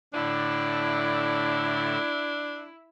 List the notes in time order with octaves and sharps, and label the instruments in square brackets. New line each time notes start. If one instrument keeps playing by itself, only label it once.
[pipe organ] A2 D3 [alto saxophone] D4 [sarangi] E4